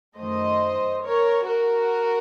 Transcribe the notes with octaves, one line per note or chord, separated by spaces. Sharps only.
F#2 D#3 A3 C5 D#5
A#4 C#5
F#4 A#4